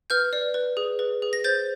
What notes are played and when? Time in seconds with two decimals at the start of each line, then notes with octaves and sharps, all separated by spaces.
0.10 B4 F6 G6
0.33 D5
0.54 B4
0.77 G#4
0.99 B4
1.22 G#4
1.33 A#6
1.44 C5 G6 A6